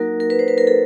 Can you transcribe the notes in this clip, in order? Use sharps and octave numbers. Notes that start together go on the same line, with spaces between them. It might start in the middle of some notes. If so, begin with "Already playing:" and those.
Already playing: F#3 A#3 D#4 F#4 A#4
A#4
B4
C5
B4
A#4
A4